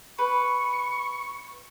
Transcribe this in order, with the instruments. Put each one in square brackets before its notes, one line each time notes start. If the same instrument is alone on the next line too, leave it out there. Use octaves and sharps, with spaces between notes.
[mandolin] B4 [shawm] C#6